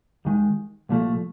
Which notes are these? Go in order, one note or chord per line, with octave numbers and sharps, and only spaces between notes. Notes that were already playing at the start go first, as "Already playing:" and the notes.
D#2 D#3 G#3
C2 A#2 F3 A3